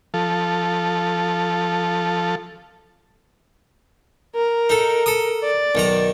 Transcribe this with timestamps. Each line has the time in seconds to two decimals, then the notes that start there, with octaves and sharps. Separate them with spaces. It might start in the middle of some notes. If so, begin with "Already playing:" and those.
0.14 F3 A4
4.35 A#4
4.69 D#4 A4
5.06 A4 D#6
5.43 D5
5.75 B1 D#3 A#5